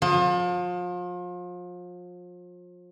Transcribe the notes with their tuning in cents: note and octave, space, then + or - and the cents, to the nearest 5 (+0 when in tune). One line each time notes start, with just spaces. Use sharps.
F3 +35